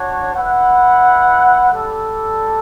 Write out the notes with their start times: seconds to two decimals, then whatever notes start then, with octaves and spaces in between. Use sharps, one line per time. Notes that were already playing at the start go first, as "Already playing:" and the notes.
Already playing: D4 F#4 C#5
0.34 E4 B4 F#5
1.71 G3 D4 A4